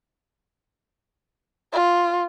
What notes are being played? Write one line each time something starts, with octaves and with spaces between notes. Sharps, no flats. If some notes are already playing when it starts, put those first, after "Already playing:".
F4